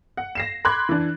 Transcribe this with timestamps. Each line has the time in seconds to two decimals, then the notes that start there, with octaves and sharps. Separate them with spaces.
0.17 F#5
0.35 A#6 C7 E7
0.65 B5 C6 D6 F#6 G#6
0.89 E3 D4